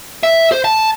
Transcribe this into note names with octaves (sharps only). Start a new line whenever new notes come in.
E5
C5
A5